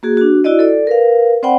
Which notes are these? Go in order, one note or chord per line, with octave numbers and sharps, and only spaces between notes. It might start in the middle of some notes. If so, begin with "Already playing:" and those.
A#3 F#4 G#4
D4 F#4
E4 F#4 D5 D#5
A4 D5
A#4 B4 F5
C4 C5 D5 F#5 G5 B5